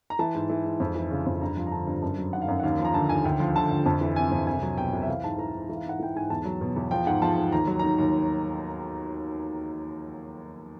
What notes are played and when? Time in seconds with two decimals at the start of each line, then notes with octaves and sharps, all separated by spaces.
0.10 A#5
0.19 E3 A5
0.35 G#2
0.50 E3
0.65 G#2
0.80 F2
0.96 E3
1.11 C#3
1.26 F2
1.41 G2 A#5
1.57 F3
1.67 A#5
1.72 D3 A5
1.87 G2
2.02 F#2 A5
2.18 F#3
2.33 D#3 F#5
2.42 F5
2.48 F#2 F#5
2.60 F#5
2.63 D#2 F5
2.79 F3
2.85 A#5
2.94 D3 A5
3.09 D#2 G#5
3.24 D2 G5
3.40 F3
3.55 D3 A5
3.71 D2
3.86 F2 A5
4.01 E3
4.16 C3 G#5
4.31 F2
4.47 C2 G#5
4.62 F#3
4.77 B2 G5
4.93 C2
5.02 E5
5.08 E3 F5
5.23 G#2 A5
5.38 E3 A#5
5.54 G#2
5.69 E3
5.75 F5
5.84 G#2 F#5
5.99 E3 G5
6.15 G#2 G#5
6.30 E2 A5
6.45 F#3
6.61 B2
6.76 E2
6.91 F3 G5
7.06 G#2 F#5
7.22 F3 A5
7.37 G#2
7.52 D#2 A#5
7.67 F#3
7.79 D#3 A#5
7.98 D#2